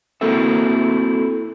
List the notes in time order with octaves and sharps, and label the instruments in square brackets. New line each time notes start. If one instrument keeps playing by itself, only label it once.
[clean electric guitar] A#3 C4 E4 F#4 A4 E5